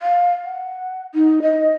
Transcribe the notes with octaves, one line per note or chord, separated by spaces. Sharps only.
F5
F#5
D#4
D#5